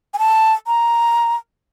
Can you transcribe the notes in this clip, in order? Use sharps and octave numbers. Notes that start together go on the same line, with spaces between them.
G#5
A5
A#5